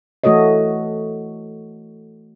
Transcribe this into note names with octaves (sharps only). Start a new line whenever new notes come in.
E3 A3 F#4 A4 C#5 D#5